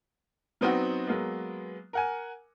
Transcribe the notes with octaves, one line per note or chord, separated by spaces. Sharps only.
F#3 B3 C4 D#4 F#4
F#3 G#3 A#3 B3
A#4 F#5 G#5